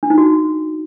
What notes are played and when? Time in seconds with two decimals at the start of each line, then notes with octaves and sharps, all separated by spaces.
0.03 D4
0.10 D#4
0.18 F#4